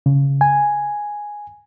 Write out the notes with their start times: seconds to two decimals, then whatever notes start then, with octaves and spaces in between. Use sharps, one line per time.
0.06 C#3
0.41 G#5